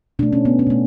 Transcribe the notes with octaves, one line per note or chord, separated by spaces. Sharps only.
B2 A3 D4
C#4
B3
C#4
B2 A3